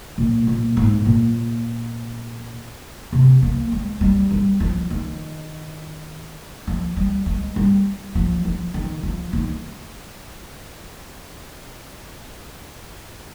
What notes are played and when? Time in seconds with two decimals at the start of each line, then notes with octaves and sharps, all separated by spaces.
0.18 A#2
0.47 A#2
0.77 G#2
1.05 A#2
3.12 C3
3.42 A#3
3.72 G#3
4.01 G3
4.31 G3
4.60 F3
4.90 D#3
6.67 F3
6.97 G3
7.26 G#3
7.56 G3
8.15 F3
8.45 F3
8.74 D#3
9.03 F3
9.33 D#3